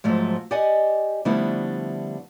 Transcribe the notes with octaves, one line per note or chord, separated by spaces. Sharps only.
G#2 F3 F#3 A3
G4 D5 D#5 F#5 G#5
D3 F3 G3 A3 B3 E4